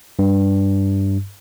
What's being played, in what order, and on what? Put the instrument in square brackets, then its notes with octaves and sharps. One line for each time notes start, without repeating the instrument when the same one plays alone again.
[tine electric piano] G2